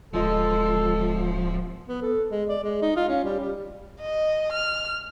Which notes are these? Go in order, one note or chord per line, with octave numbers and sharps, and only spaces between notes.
D1 F3 G#3 F4 A4 D#5
B3
A4
G#3
D5
G#3
D#4
F4
C#4
G3
G3
D#5
F6